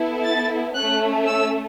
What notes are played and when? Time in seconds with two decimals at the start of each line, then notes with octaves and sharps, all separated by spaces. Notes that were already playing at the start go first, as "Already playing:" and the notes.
Already playing: B3 E4 A4
0.24 A6
0.75 A3 C#4 A4 F#6
1.27 E6